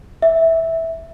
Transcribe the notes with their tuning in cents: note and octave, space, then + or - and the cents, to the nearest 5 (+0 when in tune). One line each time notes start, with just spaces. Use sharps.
E5 -10